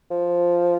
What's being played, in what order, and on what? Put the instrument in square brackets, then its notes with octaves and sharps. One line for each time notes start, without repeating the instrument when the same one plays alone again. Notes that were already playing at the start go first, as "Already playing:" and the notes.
[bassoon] F3